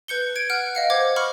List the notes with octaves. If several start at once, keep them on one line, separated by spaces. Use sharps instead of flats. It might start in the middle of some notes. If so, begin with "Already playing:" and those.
B4 G6 C#7 G7
G#6 D7
F#5 F6 F#6 C#7 D7
D#5 F5 C#7
C5 F#5 D6 G#6
B5 C#6 F6 C#7